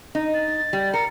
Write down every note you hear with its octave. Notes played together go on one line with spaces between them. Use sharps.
D#4
A6
G3
A#4 C#7